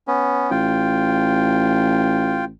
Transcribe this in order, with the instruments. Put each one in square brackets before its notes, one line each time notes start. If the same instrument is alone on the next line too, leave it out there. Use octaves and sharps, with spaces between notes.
[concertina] B3 C#4
[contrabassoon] A1 [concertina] F4 G5